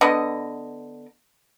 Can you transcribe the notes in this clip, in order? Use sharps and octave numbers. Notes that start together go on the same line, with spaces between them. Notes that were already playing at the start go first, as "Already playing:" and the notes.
D3 B3 D#5